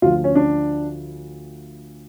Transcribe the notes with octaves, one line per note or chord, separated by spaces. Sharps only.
D2 D3 F3 F4
C#4
D4